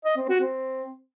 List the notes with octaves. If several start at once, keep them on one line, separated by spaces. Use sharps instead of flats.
D#5
C4
F#4
C4